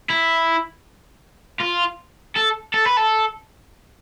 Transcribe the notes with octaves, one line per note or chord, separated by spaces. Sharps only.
E4
F4
A4
A4
B4
A4